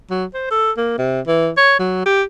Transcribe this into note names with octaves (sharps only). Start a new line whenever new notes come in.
F#3
C5
A4
A#3
C3
E3
C#5
F#3
G4